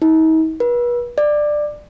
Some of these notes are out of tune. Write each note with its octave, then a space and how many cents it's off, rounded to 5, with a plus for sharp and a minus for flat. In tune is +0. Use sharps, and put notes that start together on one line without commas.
D#4 +45
B4 -35
D5 +15